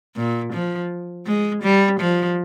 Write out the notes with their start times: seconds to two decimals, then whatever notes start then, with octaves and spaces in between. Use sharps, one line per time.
0.16 A#2
0.53 F3
1.26 G#3
1.63 G3
2.00 F3